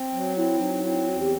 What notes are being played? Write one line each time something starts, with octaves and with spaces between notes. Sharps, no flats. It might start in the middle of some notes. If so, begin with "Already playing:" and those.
Already playing: C4
F#3
C4 E4
F#3 D#4
C4 E4
E2 F#4
G4